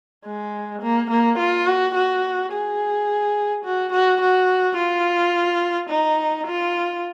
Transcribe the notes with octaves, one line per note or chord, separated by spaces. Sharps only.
G#3
A#3
A#3
F4
F#4
F#4
G#4
F#4
F#4
F#4
F4
D#4
F4